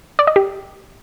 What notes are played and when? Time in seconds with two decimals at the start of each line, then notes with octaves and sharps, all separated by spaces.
0.19 D5
0.27 D#5
0.36 G4